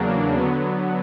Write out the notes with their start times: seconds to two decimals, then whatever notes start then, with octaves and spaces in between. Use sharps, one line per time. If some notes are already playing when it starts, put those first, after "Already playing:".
Already playing: E2 C#3 F#3 A#3 D4
0.35 D3 F#3 B3